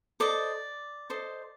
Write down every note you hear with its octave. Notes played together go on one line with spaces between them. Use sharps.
A4 C5 D5 D#5 D6
A4 C5 D#5